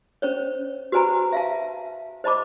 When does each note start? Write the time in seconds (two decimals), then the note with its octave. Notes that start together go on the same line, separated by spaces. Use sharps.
0.22 C#4 C5 C#5
0.92 F#4 B4 C5 G#5 A#5 B5
1.33 E5 F5 A5
2.24 C5 D#5 A5 B5 D6